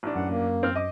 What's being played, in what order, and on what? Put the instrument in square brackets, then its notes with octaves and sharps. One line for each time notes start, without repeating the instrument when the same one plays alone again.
[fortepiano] A1 D4
[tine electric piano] F#2 [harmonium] F#5
[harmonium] A#3
[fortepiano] C4 F6
D#5 D6